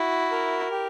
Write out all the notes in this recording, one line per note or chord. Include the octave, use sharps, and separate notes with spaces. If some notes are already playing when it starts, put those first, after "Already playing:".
Already playing: E4 F#4
A#4
G4